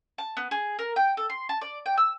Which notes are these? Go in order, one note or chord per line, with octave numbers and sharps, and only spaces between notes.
A5
B3
G#4
A#4
G5
A4
C6
A5
D5
G5
E6